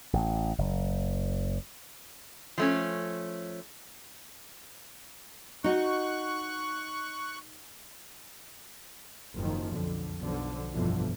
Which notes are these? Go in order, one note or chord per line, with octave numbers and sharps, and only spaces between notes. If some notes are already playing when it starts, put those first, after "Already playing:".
A1
F#1
F3 A3 C#4
D#4 F#4 C#6 F#6
F#1 G#2 D#3 F3
B1 F2 D3
B1 D3 F3
G1 F2 B2 D3 E3 F3